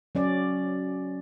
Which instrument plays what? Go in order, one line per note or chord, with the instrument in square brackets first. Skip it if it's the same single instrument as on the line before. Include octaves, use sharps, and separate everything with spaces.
[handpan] F#3 C#4 D5